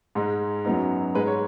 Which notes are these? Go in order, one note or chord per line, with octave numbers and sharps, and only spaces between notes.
G#2 G#3 D#4
F#2 F#3 B3 D#4
G#2 G#3 D#4 B4
C#5